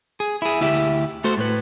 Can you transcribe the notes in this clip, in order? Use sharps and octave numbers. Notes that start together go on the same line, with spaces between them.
G#4
E4 G#4
D2 E4 G4 E5
A3 F#4 A4 C5
A2 B4